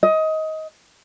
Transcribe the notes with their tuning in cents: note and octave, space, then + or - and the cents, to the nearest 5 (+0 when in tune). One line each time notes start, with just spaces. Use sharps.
D#5 +20